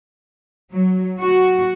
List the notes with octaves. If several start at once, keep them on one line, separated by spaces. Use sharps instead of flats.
F#3
F#4